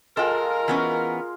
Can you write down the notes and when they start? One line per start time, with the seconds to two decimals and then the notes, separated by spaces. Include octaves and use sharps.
0.17 G#3 F4 A4 A#4 G5
0.68 E3 B3 C#4